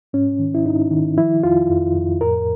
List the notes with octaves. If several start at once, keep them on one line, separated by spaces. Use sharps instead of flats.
G#2 C#4
D#3
E4
G#2 D#4
D#3
F3 E4
F2 F4
F2
F2
A2 A#4